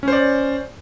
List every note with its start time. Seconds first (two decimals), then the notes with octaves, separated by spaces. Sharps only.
0.03 C#4
0.08 C5
0.13 D5